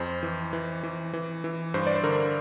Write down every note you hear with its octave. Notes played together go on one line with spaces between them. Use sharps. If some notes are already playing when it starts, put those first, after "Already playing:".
Already playing: F2 C5
E3
E3
E3
E3
E3
G2 C5
D5
C5
D3 A#4